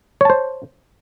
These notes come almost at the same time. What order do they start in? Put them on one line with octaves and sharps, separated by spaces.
C#5 A5 C5